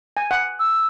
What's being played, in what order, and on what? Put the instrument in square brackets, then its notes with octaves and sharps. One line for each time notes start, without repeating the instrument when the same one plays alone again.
[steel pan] G#5
F#5
[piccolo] E6